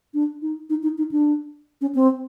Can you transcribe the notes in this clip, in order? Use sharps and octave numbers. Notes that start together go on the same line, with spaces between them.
D4
D#4
D#4
D#4
D#4
D4
C#4
C4